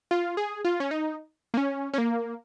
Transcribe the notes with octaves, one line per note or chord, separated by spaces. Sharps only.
F4
G#4
F4
C#4
D#4
A#3
C#4
C#4
A#3